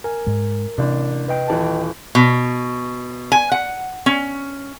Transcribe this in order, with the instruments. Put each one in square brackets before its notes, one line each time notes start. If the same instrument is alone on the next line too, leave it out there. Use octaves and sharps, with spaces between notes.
[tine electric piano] A#4 [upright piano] G#5
[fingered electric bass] G#2 G#3
[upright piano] A1 D4 [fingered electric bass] C3
[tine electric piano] B4 D#5 G5
[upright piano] D#1 E3 A5
[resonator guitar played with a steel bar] B2
G#5
F#5
C#4